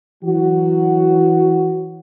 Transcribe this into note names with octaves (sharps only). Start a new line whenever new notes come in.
E3 F#3 F#4